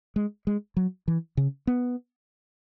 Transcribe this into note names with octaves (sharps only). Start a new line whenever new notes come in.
G#3
G#3
F#3
E3
C#3
B3